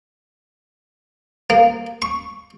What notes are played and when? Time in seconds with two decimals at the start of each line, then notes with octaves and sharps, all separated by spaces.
1.50 A#3
2.02 C#6